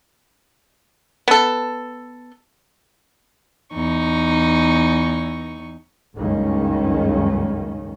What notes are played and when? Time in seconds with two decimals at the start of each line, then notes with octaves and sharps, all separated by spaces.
1.28 B3 A4
3.73 E2 D#4 C#6
6.16 F#1 C#2 G2 D#3 C#4